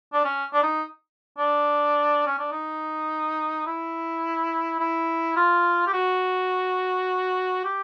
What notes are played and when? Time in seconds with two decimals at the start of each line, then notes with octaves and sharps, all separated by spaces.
0.13 D4
0.25 C#4
0.53 D4
0.63 D#4
1.38 D4
2.26 C#4
2.39 D4
2.52 D#4
3.66 E4
4.79 E4
5.36 F4
5.87 G4
5.93 F#4
7.64 G4